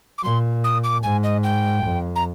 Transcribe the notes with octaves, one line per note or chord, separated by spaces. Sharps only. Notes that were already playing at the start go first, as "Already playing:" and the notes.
D6
A#2 C6
D#6
D6
G#2 G#5
D#5
G5
F2
A#5